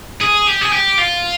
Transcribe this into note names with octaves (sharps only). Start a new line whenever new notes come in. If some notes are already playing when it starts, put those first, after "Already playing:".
G#4
G4
G#4
G4
F4